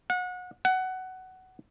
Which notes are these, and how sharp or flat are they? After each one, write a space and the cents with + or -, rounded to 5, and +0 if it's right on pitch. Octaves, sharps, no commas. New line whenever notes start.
F#5 -30
F#5 +15